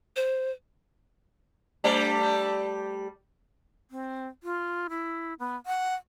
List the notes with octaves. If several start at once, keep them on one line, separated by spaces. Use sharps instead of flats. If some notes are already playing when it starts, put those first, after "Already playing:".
C5
G3 A3 D5
C4
F4
E4
B3
F#5